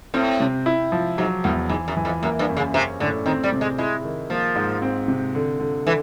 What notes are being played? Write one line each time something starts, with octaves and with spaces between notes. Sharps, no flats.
A2 C4
C3
E4
F3
G#2 F#3
E2 A2
G#2 E3
F#2
E3
F2
F#2 A#3
G2
F#2
C#3
C3 C#4
A2 D3
D#3 C4
G3
C3
G#3
G#3 E4
D#3
F3 A#3
G#2
C4
C3
D3
D3
D3 E3